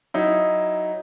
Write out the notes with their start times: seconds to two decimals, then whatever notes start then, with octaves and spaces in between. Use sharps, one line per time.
0.14 F#3 D#4 E4